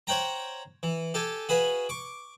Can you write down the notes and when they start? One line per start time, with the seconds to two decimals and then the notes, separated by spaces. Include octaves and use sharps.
0.07 C5 C#5 F#5 G5 A#5
0.83 E3
1.14 G4 A4 G#5
1.49 F#4 G#4 B4 F5
1.89 C#6 D6